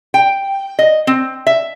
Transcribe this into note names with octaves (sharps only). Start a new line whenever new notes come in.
G5
D#5
C4
E5